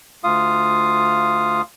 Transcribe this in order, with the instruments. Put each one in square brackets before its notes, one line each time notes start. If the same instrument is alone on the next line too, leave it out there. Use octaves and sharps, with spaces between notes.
[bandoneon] D2 F4 F5 D#6